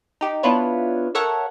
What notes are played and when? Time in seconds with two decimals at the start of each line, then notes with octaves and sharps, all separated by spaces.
0.21 D#4 G4
0.43 B3 D4 E4 F4 B4 C#5
1.15 A4 A#4 C#5 E5 F#5